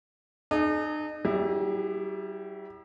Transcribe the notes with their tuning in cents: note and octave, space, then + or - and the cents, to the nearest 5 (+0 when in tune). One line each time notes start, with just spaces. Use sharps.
D#4 -40 G#4 +35
G3 -40 E4 +0 G4 +40